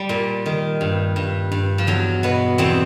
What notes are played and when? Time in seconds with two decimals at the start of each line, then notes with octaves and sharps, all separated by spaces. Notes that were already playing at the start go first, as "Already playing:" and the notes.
Already playing: G3
0.09 A#2
0.46 D#3
0.81 G2
1.16 G2
1.52 G2
1.78 F3
1.87 E2 F#3
2.23 B2 B3
2.58 E2 C4